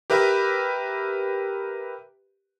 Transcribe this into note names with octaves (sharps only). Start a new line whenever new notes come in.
G4 A#4 B4 E5